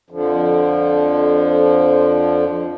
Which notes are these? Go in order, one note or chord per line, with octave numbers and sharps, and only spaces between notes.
F2 D3 F3